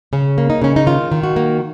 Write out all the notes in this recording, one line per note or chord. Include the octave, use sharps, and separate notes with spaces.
C#3 C#4
A#3
D#4
C#3 C#4
D#4
D#3 F4
D#3
F#4
A#3